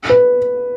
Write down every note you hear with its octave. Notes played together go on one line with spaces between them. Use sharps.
B4